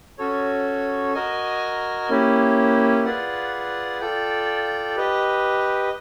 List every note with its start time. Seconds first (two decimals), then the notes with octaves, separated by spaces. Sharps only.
0.18 C#4 F#4 A4 C#5
1.14 F#4 A#4 D#5 G#5
2.10 A#3 C#4 E4 G4
3.05 F4 G#4 B4 D5 F#5
4.00 F4 A4 D5 G5
4.96 G4 B4 D#5